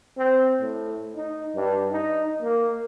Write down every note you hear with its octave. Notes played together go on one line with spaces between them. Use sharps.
C4
A2
D#4
G2
D#4
A#3